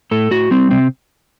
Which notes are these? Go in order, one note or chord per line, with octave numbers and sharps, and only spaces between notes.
A2 A4
A2 F#4
G3 C4
C3 C4